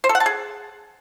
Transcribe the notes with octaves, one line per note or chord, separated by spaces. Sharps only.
C5
A4
F#5
A5
G#4